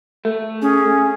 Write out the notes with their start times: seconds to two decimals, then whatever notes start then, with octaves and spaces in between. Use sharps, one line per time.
0.25 A3
0.62 C#4 G#4